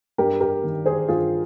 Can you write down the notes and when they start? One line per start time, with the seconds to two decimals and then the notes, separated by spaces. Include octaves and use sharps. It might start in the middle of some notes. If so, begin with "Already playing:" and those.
0.18 G2 G4 A#4
0.41 G4 A#4
0.64 D#3
0.86 G#4 C5
1.08 G2 F4 G#4